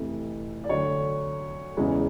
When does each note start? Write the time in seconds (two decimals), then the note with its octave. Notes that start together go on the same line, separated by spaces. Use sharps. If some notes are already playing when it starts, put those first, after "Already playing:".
Already playing: F2 C3 E3 A3
0.64 D5
0.69 D2 D3 F#3 C#5
1.77 E2 C#3 E3 G#3